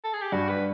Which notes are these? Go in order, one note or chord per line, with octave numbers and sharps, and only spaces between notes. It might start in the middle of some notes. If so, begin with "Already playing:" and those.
A4
G#4
G4
G2 F#4
B4